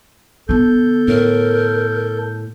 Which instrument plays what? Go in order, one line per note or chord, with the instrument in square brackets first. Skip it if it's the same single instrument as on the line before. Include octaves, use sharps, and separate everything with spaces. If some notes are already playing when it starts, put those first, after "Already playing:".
[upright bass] D3 B3 [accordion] A4 G6
[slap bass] A2 [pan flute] A#4